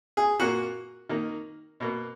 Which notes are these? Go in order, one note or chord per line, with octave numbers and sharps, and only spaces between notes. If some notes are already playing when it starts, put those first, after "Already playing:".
G#4
A#2 A#3 F#4
D#3 A#3
B2 A#3